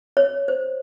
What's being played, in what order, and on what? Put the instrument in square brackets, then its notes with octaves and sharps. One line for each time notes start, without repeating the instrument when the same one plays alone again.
[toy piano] C#5
C5